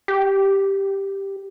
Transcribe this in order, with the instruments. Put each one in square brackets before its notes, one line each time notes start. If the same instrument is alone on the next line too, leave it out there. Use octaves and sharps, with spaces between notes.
[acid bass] G4